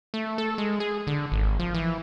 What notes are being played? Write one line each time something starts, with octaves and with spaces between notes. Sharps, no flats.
A3
A4
G#3
G#4
D3
G#1
F3
E3